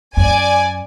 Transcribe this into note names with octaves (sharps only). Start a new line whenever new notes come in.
F#2 D5 G#5